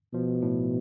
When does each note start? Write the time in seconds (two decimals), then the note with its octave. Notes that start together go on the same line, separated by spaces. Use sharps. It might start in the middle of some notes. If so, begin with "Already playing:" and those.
0.13 B2 F3
0.42 A2